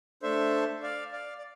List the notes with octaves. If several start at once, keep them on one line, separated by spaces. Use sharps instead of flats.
A3 D4 A4 C5 E5
D5 F5
D5 F5
D5